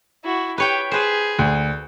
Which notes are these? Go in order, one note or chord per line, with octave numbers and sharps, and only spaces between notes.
E4 F#4
G4 B4 C#5 G5
G#4 B4 C5
D2